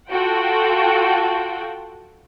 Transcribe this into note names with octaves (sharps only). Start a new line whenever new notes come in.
F4 F#4 A4 F#5 G5